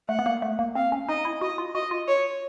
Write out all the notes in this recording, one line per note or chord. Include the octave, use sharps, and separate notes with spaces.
A3 F#5
B3
A#3
A3
A#3
C4 F5
C#4
D#4 D#5
E4
F#4 D#5
F4
F#4 D#5
F4
C#5